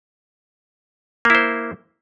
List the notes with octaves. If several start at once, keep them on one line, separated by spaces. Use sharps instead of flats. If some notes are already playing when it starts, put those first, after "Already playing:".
A#3 E4 C5